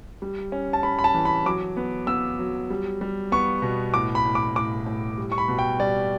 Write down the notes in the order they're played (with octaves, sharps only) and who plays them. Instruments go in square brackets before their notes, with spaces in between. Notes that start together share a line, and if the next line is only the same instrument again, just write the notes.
[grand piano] G3
C#4
A5
C#4 B5
B5
A5
E3
B5
F#3 D6
B3
B3 E6
F#3
G3
G3
B3 C#6
B2
A2 D6
B5
A2
D6
A2 D6
A2
G3
C#6
B5
B2
G5
G3 D5